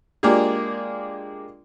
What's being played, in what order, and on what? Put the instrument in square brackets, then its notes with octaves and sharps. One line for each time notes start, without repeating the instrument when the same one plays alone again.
[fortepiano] G#3 A#3 D4 F4 G4 G#4